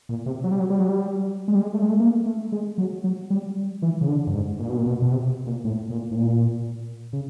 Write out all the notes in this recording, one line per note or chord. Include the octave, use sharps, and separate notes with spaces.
A#2
C3
F#3
G3
F#3
G3
F#3
G3
G#3
G3
G#3
A3
G#3
A3
A#3
A3
G#3
F#3
F#3
G3
E3
C#3
D3
G2
G#2
A#2
B2
A#2
B2
B2
C3
A#2
A2
A#2
A2
A#2
C#3